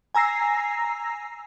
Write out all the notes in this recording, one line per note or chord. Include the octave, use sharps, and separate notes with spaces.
G#5 A#5 E6 A#6 C7